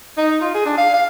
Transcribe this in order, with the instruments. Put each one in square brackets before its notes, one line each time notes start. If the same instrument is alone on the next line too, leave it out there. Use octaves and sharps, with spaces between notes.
[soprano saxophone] D#4
F4
G#4
D4
F5
F5